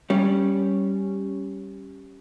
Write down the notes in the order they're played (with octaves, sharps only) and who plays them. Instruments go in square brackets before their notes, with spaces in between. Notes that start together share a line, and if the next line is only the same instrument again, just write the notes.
[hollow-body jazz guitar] G3 C#4